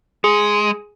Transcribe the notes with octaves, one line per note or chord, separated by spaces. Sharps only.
G#3 G#4